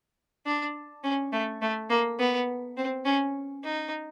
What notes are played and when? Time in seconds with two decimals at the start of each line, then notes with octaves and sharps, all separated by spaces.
0.46 D4
1.04 C#4
1.33 A3
1.62 A3
1.90 A#3
2.19 B3
2.77 C4
3.05 C#4
3.64 D#4